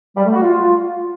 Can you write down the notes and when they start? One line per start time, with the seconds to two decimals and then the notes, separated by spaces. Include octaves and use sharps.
0.16 G3
0.25 A3
0.33 F#4
0.42 F4